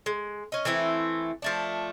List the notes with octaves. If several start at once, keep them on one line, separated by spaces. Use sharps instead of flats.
G#3
C#4 D#5
E3 A3 C4 E4
F3 A3 D4